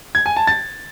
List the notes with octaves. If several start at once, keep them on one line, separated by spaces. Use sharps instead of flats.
G#6
G#5
A5
A6